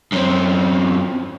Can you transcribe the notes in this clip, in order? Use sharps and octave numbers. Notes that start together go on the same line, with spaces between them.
F#2 C4